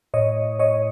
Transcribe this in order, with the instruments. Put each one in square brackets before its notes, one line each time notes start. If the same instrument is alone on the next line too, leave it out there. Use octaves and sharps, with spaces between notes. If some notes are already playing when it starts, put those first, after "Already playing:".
[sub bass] A2 [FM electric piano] C#5 D#5
[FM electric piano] C#5 D#5